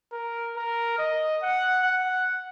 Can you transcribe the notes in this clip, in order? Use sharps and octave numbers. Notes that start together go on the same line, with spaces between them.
A#4
A#4
D#5
F#5
F#5